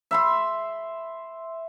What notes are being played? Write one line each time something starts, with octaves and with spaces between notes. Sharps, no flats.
E5 B5 C6